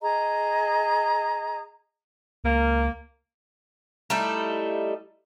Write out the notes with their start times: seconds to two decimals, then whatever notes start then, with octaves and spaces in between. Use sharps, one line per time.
0.02 G#4 D#5 A#5
2.44 C#2 A#3
4.10 G3 A3 D#4 E4